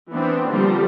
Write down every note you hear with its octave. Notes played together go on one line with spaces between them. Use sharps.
E3 B3 C4 D4
D3 F3 G3 A#3 C4